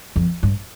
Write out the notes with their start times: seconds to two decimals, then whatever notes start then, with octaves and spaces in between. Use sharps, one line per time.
0.16 F2
0.43 G2